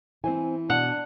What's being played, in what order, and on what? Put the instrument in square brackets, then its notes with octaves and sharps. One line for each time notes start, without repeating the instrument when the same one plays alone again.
[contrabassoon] E3 [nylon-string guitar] C4 C5 G#5
[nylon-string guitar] B2 [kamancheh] D4 [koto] F#5